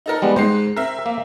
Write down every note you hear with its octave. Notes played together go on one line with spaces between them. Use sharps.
D#4 A4 A#4
G3 G#3 B3
G#2 G#3 C5 C7
C4 A#4 E5
A#3